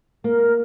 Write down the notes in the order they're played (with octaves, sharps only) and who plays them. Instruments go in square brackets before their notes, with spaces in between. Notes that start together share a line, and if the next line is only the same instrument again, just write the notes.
[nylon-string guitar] A#3 [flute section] A#4